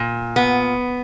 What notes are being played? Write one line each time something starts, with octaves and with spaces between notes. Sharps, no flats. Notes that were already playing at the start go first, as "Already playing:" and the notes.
Already playing: A#2
B3